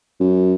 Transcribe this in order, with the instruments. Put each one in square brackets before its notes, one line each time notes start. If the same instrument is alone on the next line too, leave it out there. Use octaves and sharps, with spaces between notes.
[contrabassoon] F#2